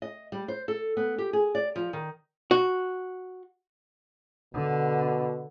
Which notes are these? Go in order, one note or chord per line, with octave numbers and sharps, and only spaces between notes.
D#5
G3
C5
A4
B3
G4
G#4
D5
F3
D#3
F#4
B2 D3